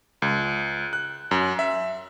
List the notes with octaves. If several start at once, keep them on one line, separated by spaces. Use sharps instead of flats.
C#2
F#6
F#2
E5